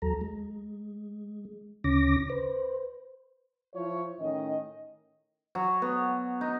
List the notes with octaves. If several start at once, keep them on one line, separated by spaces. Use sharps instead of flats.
D#2 F#3 A4 A#5
G#3
D2 C#3 C#4 D6 A#6
B4 C5
F3 E4 C#5
A2 D#3 C#4 D#5
F#3
B3
D#4